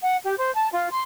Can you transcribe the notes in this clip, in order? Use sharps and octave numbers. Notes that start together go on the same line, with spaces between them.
F#5
G4
C5
A5
F4
C6